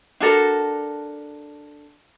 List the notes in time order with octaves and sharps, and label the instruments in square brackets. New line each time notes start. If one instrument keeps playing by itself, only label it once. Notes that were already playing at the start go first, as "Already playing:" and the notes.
[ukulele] D4 F#4 A4 A#4